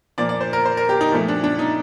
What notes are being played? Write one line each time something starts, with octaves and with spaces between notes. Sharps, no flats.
A#2 F3 A#3 D5
D5
C5
A#4
C5
A#4
G4
D#4
A#2 F3 A3
D4
D4
D#4